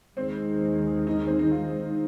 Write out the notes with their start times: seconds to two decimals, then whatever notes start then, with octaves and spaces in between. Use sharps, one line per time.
0.16 D#2 D#3 G#3 C4
1.07 D#4
1.27 C4
1.39 D#4
1.51 F4